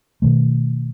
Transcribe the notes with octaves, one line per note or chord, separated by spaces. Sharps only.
B2 D#3 A3